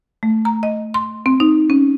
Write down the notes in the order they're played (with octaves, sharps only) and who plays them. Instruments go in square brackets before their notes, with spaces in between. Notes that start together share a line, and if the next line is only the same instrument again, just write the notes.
[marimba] A3
A#5
D#5
C6
C4
D#4
C#4